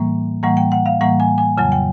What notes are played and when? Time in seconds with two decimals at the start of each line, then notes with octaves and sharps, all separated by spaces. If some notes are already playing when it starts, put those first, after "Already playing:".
Already playing: A2 E3 G3 A#3
0.43 A2 E3 G3 A#3 F#5
0.57 G5
0.72 F#5
0.86 F5
1.01 A2 E3 G3 A#3 F#5
1.20 G#5
1.38 G#5
1.57 F2 C#3 F#3 G#5
1.72 G5